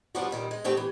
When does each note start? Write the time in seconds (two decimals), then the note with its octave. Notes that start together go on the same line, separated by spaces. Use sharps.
0.15 F3 G3 A#3 B3 D4 F#4
0.31 A#2 D#3 G3
0.51 G#3
0.64 E2 A3 C4 G4 G5
0.77 E3